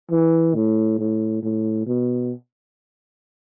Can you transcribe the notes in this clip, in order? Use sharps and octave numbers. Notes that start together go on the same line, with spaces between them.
E3
A2
A2
A2
B2